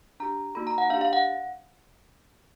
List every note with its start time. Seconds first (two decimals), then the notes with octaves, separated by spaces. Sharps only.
0.20 D4 G4 A#5
0.55 A#3 D#4 F#4 A4 B5
0.67 A#5
0.78 F#5
0.90 D4 F5
0.94 G4
1.01 F5
1.13 F#5